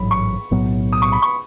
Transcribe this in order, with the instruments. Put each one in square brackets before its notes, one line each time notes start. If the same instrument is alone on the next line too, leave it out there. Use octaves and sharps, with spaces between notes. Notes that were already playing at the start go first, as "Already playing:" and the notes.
Already playing: [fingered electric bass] A1 G#2 F#3 [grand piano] B5
[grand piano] C#6
[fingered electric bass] B1 A2 F#3 B3
[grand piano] D#6
C#6
B5
C#6